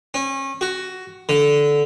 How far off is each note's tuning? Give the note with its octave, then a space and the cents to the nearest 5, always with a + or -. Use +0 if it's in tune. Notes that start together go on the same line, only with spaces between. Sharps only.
C#4 -30
F#4 +10
D3 -15